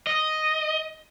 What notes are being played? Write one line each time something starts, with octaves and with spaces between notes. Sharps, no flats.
D#5